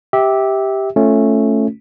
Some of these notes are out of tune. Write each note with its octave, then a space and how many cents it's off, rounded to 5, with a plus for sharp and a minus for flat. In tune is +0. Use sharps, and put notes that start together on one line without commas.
G4 +0 E5 -20
A3 +0 C#4 -5 F4 -5